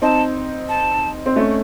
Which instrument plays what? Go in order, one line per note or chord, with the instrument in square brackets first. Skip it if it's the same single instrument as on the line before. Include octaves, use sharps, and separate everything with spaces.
[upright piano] C4 D#4 [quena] A5
[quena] A5
[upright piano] C4
A3 C#4